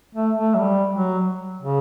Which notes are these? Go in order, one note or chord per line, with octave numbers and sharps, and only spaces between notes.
A3
A3
F#3
G3
F#3
C#3